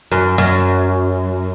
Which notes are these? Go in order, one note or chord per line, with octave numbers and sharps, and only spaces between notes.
F#2
F#2